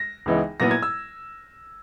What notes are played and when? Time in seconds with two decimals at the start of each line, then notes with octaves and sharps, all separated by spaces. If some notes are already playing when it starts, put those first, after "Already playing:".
Already playing: A#6
0.26 C#2 C#3 E3 B3 D#4
0.60 A#2 F#3 B3 E4 A#6
0.71 G#6
0.82 E6